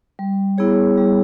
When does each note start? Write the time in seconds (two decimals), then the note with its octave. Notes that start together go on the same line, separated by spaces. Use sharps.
0.19 G3
0.58 B3 E4 G#4 C#5
0.98 G3